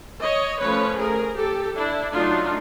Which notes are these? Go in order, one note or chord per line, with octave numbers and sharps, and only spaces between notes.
C#5 D#5
F3 A3 C#4 B4 C#5
G#4 A#4
G4 A4
D4 E4
F#3 A3 D4 D#4 F4